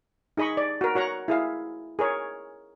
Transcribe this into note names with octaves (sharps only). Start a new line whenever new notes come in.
D#4 G#4 D#5 B5 C#6
D5
F#4 A#4
F#4 C#5 F#5 A#5
E4 G#4 F5
G#4 A#4 C#5